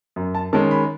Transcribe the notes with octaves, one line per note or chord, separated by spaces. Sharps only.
F#2
A5
D#3 G#3 C#4 A5
B5